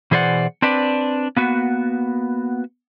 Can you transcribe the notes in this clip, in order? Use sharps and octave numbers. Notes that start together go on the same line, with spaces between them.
B2 E3 G#4 C5 D5 F#5
C4 D4 B4 D5
A#3 B3 F#4 B4